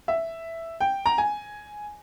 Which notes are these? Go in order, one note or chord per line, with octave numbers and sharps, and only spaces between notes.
E5
G5
A#5
G#5